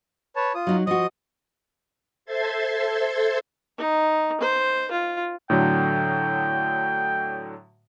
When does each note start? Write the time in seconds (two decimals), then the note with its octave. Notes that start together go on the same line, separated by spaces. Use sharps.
0.36 B4 C#5 A5
0.55 F4 D#6
0.67 F#3 D#4
0.87 F3 F#4 D#5 D#6
2.25 A4 C5 E5 C6 G#6 A6
3.78 D#4
4.41 C5
4.91 F4
5.50 A2 D3 F#3 G5